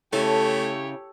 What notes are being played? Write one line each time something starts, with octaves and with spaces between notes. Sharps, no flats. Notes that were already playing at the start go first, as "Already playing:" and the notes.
C#3 A3 E4 G4 A4 C#5